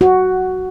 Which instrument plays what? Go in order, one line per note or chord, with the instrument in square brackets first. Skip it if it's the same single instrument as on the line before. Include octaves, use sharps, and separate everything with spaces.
[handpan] F#4